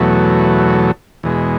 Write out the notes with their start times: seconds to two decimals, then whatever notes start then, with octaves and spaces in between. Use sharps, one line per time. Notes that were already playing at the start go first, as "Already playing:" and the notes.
Already playing: E2 B2 F#3 A3
1.23 E2 B2 G#3